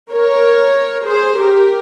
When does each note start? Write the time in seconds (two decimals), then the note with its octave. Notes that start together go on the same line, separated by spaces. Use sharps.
0.11 A#4 C#5
1.06 G#4 C5
1.38 G4 A#4